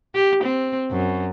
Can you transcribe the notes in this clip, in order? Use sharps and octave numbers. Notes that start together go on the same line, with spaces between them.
G4
C4
F#2